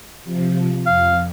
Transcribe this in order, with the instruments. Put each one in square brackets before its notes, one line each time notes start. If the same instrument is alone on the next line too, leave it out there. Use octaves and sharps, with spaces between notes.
[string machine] C3 F3
[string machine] F2 [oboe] F5